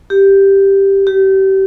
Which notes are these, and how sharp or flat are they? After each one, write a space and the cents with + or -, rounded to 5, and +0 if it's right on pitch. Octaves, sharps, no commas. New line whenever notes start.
G4 +0
G4 -30